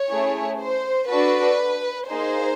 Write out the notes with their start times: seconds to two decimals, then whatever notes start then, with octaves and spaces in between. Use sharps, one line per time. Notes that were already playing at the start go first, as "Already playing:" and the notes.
Already playing: C#5
0.10 A3 C#4 E4 G#4
0.60 C5
1.09 D4 F#4 A4 B4
2.08 A#3 D#4 G#4 C5